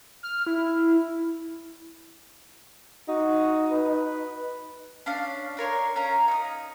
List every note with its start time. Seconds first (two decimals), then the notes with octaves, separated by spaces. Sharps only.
0.23 F6
0.47 E4
3.08 D#4 F#4
3.71 B4
5.06 C#4 D4 D5 F5
5.57 D4 A#4 C#5 C6
5.96 C#4 A#4 F5 A#5
6.28 D#4 D#6